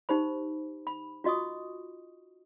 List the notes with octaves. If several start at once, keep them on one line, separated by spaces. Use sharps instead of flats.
D#4 G4 C5 B5
B5
F4 F#4 D#5 C#6 D#6